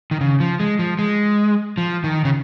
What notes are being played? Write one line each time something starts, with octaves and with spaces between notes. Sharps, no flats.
D#3
C#3
F3
G#3
F3
G#3
F3
D#3
C#3